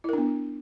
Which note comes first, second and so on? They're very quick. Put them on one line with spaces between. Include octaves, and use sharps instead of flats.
E4 A#4 D4 B3